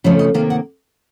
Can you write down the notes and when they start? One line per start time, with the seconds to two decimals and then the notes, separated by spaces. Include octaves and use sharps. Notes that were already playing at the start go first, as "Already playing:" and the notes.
0.04 F2 C#3 F3 A3 C#4 C#5
0.19 D#5
0.34 C3 D#3 A#3 F5
0.50 F#5